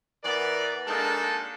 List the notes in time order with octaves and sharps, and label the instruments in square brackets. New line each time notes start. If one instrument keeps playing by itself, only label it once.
[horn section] E3 B3 A#4 D5
G#3 A#3 D4 D#4 F#4 A4